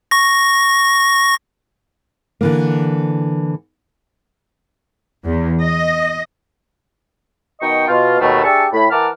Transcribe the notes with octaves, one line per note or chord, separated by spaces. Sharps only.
C#6 A#6
D3 E3 A#3
E2
D#5
B2 D#3 D#4 D#5 G5 C#6
B2 F4
D#2 B2 A3
D4 G4 G#4 E5 A5 C#6
A2 B5
E3 A#4 F#5 A5 D6 F6